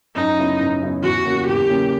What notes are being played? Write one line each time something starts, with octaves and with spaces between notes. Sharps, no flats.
F#2 D#4
C#3 F#3 B3 E4
F#2
C#3 F#3 B3 E4
E2 F#4
C#3 F#3 A#3
E2 G4
C#3 F#3 A#3